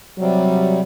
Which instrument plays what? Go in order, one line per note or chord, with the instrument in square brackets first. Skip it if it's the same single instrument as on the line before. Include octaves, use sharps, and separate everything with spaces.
[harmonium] C3 G3 [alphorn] F#3